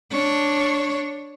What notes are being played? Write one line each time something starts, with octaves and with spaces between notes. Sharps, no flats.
D4 C#5